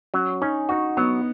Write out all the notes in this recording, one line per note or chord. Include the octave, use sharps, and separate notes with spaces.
F#3 C#4
C#4 D#4
D#4 F#4
F#3 B3